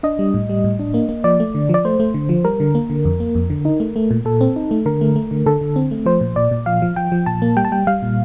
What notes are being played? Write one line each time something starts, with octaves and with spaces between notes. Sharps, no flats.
D4 D#5
G3
A2
G3
A2
D4
A#3
A#3
F3 D5
A3
D3
F3 D5
A3 C5
A3
D3
F3
G3 A#4
D3
A#3
D3
F2
A#3
F2
D3
D#4
A3
A3
A#2
A#2 A4
C4
D#4
A3
D3 A#4
A3
A3
D3
D3 A4
D3
C4
A3
F3 C5
A#2
A#2 D5
A#2
F3 F5
F3
F3 G5
F3
A#2 A5
A#3
G3 G5
A5
G3 G5
G3 F5
A#2